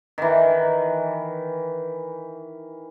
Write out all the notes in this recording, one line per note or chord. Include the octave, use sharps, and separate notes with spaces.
D#3 E3